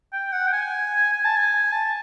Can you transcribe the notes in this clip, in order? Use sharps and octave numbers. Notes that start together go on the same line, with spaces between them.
G5
F#5
G5
G#5
G#5
A5
G#5
A5